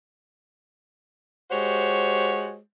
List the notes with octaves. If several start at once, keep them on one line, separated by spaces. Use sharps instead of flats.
G#3 F#4 G4 C5 C#5